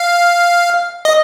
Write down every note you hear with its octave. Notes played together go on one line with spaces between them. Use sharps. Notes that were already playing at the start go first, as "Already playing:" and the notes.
Already playing: F5
D#5